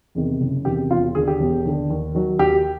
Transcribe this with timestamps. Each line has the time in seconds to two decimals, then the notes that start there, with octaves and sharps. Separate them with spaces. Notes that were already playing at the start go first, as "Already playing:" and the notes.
0.15 E2 C3 D#3
0.41 F#1
0.65 E2 C3 D#3 G4
0.90 E1 F4
1.15 D#2 G#4
1.18 D3
1.28 G4
1.40 E1
1.65 D#2 D3
1.90 D#2
2.15 D#3 F#3
2.39 D#2 G4